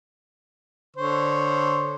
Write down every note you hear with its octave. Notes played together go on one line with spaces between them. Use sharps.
D3 C5 C#5